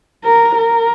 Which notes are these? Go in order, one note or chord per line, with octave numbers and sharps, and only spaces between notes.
A#4
A#4